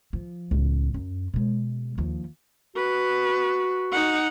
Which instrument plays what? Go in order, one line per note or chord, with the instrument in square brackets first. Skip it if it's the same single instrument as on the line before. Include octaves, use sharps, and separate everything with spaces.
[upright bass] F3
C#2 A2
F#2
B2 G#3
D#2 F3
[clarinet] F#4 [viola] B4
[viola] D#4 F#5